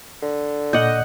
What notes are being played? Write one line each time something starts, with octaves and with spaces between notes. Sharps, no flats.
D3
A#2 D5 D#5 F#5 G6